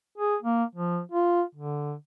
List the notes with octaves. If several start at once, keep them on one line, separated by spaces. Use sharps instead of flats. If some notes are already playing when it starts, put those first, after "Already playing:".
G#4
A#3
F3
F4
D3